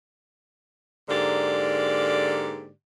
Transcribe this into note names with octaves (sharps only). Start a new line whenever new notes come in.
G#2 D3 A#3 G4 D5